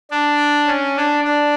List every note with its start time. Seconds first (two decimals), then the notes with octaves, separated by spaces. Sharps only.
0.11 D4
0.67 C#4
0.96 D4
1.24 D4